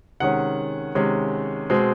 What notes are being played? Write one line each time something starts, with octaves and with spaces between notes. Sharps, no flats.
C3 D#3 G#3 C#4 F#5
C3 D#3 G#3 C#4
B2 G#3 C4